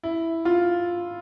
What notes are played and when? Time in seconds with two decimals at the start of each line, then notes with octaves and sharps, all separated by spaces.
0.03 E4
0.45 F4